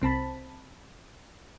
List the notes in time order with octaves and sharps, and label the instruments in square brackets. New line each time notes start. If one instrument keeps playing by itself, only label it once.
[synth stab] C2 C4 A5 B5